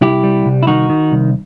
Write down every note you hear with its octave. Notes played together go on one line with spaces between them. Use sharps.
C2 E4 G4
G3
C2
E4
D#3 D#4 F#4
D#3
C2